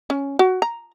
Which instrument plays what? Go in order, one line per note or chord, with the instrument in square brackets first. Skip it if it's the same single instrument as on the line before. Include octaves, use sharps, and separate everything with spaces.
[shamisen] C#4
F#4
A#5